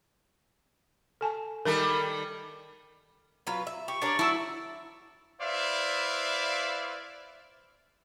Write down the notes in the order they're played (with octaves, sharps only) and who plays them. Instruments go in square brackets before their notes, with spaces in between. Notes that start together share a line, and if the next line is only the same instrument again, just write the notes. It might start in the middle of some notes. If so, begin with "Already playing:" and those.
[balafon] A4 G#5 A5
[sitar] D#3 G3 A4 [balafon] A#4 E5 B5
[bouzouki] F#3 F4 B4
E5
[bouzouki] G4 [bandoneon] C#6
[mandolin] D4 D5 [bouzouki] G4 A#4 C#5
[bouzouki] F#3 A3 [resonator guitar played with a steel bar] E4 [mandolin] A5 E6
[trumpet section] E4 B4 C5 D5 E5 F5